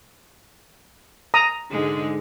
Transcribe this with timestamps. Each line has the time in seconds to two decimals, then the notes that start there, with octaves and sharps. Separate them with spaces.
1.34 A#5 D#6
1.71 G#2 D3 G#3